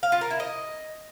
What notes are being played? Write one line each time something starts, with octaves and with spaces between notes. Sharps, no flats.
F5
F4
A#4
E4
D#5